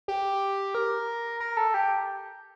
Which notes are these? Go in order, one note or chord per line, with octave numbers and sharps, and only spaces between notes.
G4
A#4
A#4
A4
G4